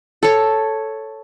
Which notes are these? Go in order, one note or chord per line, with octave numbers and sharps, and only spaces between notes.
A4 C#5